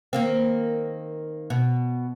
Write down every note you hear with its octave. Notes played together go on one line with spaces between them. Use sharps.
D#3 A#3 C4
B2